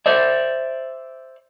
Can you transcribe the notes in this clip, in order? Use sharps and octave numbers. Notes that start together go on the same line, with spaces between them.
C5 D5 E5